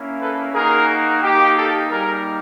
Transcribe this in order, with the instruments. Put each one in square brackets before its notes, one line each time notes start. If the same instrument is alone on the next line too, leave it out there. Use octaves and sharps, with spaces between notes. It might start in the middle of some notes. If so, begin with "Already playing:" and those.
Already playing: [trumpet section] A#3 C#4 E4
A4 B4
A#3 D#4 F#4 G#4 A#4
A#3 D#4 G4
G4 A4
G3 A#3 D#4 G4 G#4 A#4